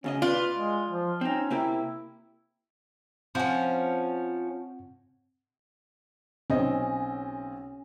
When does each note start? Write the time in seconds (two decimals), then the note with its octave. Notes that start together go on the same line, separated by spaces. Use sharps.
0.04 D2 C#3 C#4 D#5
0.22 F4 B4 D5
0.56 G#3
0.89 F3
1.21 C4 C#4 D#4
1.51 C3 A#3 E4 G4
3.35 F3 C4 C#4 F#5
6.50 B1 C4 C#4 D#5